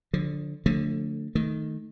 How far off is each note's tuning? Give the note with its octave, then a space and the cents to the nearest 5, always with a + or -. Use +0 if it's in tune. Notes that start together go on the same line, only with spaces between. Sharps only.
D3 +0 F3 +30
D3 +0 F3 +35 A3 +20
D#3 +0 A3 +0